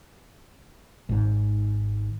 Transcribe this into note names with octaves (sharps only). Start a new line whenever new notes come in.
G#1 G#2